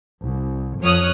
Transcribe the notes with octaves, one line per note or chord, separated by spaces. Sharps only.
C2
F2 F3 C#5 D#6 F6 F#6